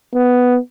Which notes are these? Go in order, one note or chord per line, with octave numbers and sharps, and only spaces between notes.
B3